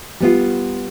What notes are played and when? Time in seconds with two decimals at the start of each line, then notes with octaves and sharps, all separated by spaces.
0.20 G3 B3 F4